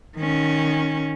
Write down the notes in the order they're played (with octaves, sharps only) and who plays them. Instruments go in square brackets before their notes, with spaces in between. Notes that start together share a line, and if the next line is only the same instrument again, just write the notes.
[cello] D#3 C#4